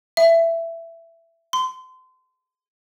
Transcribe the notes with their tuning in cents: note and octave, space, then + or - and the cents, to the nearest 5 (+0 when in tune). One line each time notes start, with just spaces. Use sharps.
E5 +15
C6 -30